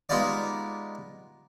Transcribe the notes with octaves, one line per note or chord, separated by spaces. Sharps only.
G#3 B3 D#4 F4 G4 D5